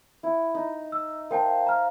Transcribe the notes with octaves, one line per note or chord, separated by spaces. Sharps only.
E4
D#4
E6
A#4 C5 F5 G5 A5
A#5 F6